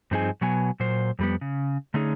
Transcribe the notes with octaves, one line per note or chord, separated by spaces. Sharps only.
G2 F3 C4 D#4 G#4 G#5
B2 F#3 B3 G#5
A#2 F#3 C5
F2 G3 B3
C#3
D3 A3 C#4 D#4 G#4